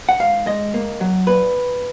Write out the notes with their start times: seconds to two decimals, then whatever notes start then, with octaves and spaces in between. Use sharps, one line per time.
0.09 F#5
0.19 G#2 F5
0.46 G#3 D#5
0.74 A#3
1.01 F#3
1.27 A#2 B4